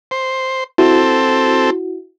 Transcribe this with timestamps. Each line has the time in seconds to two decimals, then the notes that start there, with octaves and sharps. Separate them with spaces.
0.11 C5
0.78 C4 E4 F#4 A4